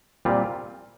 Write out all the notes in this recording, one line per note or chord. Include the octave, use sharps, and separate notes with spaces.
A#2 G3 C4 F4